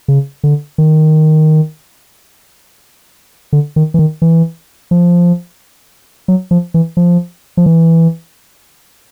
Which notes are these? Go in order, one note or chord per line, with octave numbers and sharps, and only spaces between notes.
C#3
D3
D#3
D3
D#3
E3
D#3
E3
F3
F#3
F3
E3
F3
F3
E3